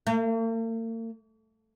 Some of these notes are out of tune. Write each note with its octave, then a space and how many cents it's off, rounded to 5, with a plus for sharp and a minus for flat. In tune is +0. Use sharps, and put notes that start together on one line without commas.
A#3 -45